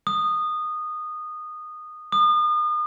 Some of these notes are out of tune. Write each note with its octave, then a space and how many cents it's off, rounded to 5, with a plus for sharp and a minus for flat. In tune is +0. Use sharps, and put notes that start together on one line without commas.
D#6 -15
D#6 -35